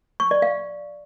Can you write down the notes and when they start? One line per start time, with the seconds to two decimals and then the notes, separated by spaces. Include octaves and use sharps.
0.20 C#6
0.31 D5
0.42 F5